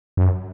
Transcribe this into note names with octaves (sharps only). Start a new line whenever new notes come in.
F#2